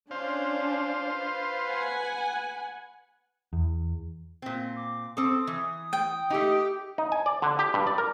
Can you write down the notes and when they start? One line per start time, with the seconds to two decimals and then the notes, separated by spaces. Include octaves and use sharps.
0.11 C#4 D4 C5 F5
1.08 B4
1.66 F#5 G#5
3.53 E2
4.42 A#2 C4
4.76 D6
5.17 C4 A4 D#6
5.47 E3
5.93 G5
6.30 A3 D#4 G4
6.98 D#4
7.12 G#5
7.26 D5
7.42 D3
7.59 G4
7.74 G2
7.87 D5
7.98 A#4